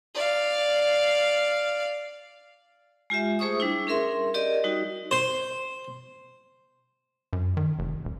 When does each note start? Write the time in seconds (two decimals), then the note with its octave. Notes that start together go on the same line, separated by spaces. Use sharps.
0.15 D5 F5
3.10 G#3 F4 G4 E5
3.39 A3 G#4 C5 E5 C#6 D#6
3.60 G3 D4 E4
3.87 C#4 G#4 A#4 E5 C6
4.34 G4 A#4 D5 D#5
4.64 G3 D#4 F#4
5.11 C5
7.33 F#2
7.57 D#3
7.79 F1
8.05 D#1